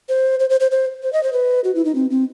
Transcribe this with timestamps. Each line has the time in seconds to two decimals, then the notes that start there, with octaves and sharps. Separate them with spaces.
0.09 C5
0.40 C5
0.50 C5
0.60 C5
0.71 C5
1.03 C5
1.13 D#5
1.23 C5
1.33 B4
1.64 F#4
1.75 E4
1.85 D#4
1.95 C4
2.10 C4